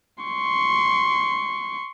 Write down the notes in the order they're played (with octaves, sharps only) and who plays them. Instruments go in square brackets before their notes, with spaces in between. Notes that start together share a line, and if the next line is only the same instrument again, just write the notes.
[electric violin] C6 C#6